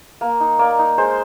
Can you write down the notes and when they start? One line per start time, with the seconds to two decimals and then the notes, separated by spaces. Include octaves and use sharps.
0.21 A#3
0.40 D#4
0.59 A#3 D5
0.79 D#4
0.98 G#3 C5